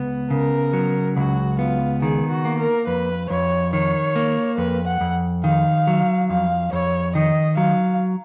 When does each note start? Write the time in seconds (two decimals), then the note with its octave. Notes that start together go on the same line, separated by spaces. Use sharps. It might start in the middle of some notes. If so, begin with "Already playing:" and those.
Already playing: C#2 B3
0.31 C#3 A#4
0.73 F#3
1.16 C#2 F#4
1.59 B3 F4
2.02 D#3 G#4
2.30 F#4
2.45 A#3
2.59 A#4
2.87 F2 B4
3.30 F2 C#5
3.73 D#3 C#5
4.16 A#3
4.58 F2 B4
4.87 F#5
5.01 F2
5.44 D#3 F5
5.87 F#3
6.30 F2 F5
6.72 F2 C#5
7.15 D#3 D#5
7.57 F#3 F5